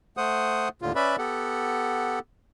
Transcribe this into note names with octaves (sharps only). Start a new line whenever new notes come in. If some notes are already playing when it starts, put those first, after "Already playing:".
A3 C5 F#5 D#6
D#2 A2 D3 F4
C#4 B4 D5 E5 B5
B3 G4 A4 F#5